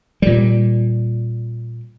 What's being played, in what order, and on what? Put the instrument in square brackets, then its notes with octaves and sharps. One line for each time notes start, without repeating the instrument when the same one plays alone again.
[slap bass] A#2 G3